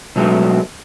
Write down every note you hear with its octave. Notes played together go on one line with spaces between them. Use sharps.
B2 F#3 G#3 A3